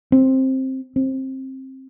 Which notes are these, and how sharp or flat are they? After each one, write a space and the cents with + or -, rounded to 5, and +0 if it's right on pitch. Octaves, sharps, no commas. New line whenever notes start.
C4 +10
C4 +20